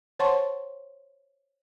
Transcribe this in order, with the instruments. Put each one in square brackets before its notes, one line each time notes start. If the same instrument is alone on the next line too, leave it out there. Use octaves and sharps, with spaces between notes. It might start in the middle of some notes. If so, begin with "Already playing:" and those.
[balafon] C5 C#5 F#5 A5 C6 C#6